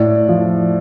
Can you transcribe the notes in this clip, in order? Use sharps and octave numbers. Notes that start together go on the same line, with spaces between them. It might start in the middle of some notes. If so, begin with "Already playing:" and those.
Already playing: A2 D5
F3